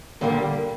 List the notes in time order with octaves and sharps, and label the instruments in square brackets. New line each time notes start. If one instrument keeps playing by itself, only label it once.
[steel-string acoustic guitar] A#2 G3 A#3 G4 [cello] D3